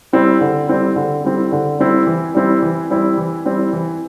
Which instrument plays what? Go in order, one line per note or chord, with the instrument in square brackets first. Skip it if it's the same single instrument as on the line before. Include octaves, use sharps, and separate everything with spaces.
[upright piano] G3 C4 E4
D3
G3 C4 E4
D3
G3 C4 E4
D3
G3 C4 E4
E3
G3 C4 E4
E3
G3 C4 E4
E3
G3 C4 E4
E3